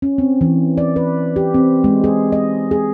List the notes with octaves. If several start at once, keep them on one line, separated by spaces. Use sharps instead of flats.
C#4
C4
E3
D5
B4
G4
C4
G#3
G#4
D#5
G#4